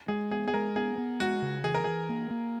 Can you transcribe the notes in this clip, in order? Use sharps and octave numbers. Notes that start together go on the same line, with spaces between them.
G#3 G#4
B3 G#4
G#4
G#3 A#4
B3 G#4
B3
G#3 F#4
C#3
E3 G#4
A#4
E3 G#4
A#3
A#3